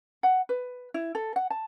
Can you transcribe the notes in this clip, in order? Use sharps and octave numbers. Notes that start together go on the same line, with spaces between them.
F#5
B4
E4
A4
F#5
A5